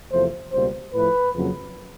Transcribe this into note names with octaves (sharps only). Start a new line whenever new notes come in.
E2 C3 F3 A3 C5
C#2 B2 G3 A#3 C5
A2 F3 A3 B4
F2 C#3 F#3 A#3